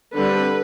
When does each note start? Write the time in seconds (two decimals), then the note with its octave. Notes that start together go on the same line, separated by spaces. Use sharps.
0.15 D3 G3 C4 A4 B4